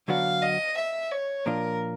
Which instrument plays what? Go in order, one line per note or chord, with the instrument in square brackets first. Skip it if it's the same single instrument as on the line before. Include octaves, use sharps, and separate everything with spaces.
[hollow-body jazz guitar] D3 F#3 B3 D4 F#4 [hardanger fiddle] F5
[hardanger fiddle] D#5
E5
C#5
[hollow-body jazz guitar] A#2 F3 A#3 D4 F4 [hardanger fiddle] A#4